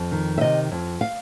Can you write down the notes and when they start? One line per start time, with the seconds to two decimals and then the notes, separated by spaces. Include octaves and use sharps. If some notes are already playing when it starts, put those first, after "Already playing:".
Already playing: F2
0.12 D#3
0.38 E5
0.41 C3 D#5
0.72 F2
1.01 F5